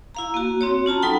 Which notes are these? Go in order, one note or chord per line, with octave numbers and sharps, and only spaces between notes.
E4 F5 A#5
A#3 F#4
C4 F#4 C#5
C#4 F4 A5 A#5
F#3 D#4 A4 F#5 G5 B5